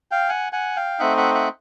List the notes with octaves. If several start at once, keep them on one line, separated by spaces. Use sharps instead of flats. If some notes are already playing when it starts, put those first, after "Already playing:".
F5 G5
F#5 G#5
F#5 G#5
F5 G5
A3 C4 D#4 E5 F#5
E5 F#5
E5 F#5